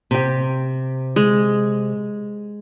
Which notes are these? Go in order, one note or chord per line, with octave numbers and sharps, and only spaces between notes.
C3 G4
G#3